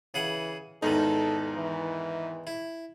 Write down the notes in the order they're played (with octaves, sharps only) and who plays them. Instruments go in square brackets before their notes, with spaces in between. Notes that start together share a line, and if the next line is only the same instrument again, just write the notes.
[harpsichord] C#3 G#4 F#5 [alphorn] E3
[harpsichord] E2 D#3 [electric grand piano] G#2 D#4 [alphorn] A4
[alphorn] E3
[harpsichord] E4